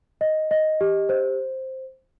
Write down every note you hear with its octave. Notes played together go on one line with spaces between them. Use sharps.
D#5
D#5
G4
C5